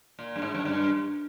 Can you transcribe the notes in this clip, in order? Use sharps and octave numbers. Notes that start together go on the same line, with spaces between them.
A#2
G2
G#2
F#2
G2